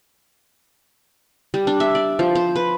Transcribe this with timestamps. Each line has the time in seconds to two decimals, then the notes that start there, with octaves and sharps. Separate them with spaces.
1.54 G3
1.67 D4
1.80 E5
1.95 D5
2.19 F3
2.35 C5
2.56 B4